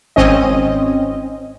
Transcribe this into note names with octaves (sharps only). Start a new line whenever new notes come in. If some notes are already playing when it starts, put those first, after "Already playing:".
G#1 C4 C#4 D#5